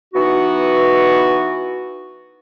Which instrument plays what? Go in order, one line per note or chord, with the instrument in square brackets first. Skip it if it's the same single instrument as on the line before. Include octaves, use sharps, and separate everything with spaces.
[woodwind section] E3 B3 D#4 F#4